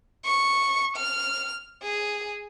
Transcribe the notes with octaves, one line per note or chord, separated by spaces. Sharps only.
C#6
F6
G#4